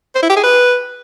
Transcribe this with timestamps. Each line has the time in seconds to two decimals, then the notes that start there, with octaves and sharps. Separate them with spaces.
0.15 C5
0.22 E4
0.29 G4
0.36 G#4
0.43 B4